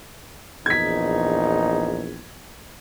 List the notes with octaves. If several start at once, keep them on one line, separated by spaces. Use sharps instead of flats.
A#1 E2 D#4 G#6 B6